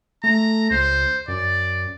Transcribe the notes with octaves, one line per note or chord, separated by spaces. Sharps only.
A3 A#5
C#2 C5
F#2 D5